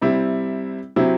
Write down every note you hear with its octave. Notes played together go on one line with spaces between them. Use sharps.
C3 G3 C4 E4
C3 F#3 C4 E4